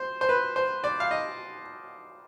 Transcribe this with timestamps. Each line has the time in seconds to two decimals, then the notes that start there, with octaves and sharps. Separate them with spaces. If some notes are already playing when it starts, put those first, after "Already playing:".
Already playing: C5
0.21 C5
0.29 B4
0.56 C5
0.84 D5
1.00 F5
1.11 D#5